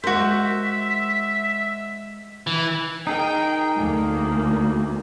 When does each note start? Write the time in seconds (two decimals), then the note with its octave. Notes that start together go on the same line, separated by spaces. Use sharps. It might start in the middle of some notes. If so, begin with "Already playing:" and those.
0.04 G#3 F#4 A#4 C5 E5
2.47 E3
3.07 D#4 G#4 A#4 G5
3.76 D2 A#3